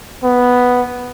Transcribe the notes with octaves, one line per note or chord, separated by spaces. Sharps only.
B3